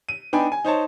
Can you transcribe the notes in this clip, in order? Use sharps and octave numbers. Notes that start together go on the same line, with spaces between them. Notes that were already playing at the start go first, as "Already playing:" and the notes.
D#7
B3 D4 D#4 G5 G#5 B5
G#5
D#4 C5 C#5 A5